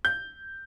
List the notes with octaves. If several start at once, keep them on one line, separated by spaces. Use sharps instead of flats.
G6